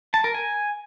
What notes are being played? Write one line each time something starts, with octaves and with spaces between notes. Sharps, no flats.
A5
A#4
G#5